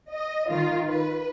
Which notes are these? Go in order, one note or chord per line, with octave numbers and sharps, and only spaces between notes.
D#5
D#3 F4
B4